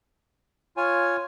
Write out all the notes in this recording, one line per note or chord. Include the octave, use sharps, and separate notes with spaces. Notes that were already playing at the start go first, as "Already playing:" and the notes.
F4 C#5 G#5